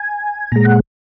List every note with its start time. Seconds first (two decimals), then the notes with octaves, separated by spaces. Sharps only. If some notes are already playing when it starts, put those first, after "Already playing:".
Already playing: G#5
0.52 A#2 G#3 A#5
0.65 F#5